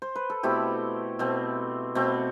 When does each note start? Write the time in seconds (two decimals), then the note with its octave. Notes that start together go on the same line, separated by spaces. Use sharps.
0.02 C5
0.16 B4
0.30 A4
0.43 B2 A3 C4 E4 G4
1.19 B2 A3 C4
1.95 B2 A3 C4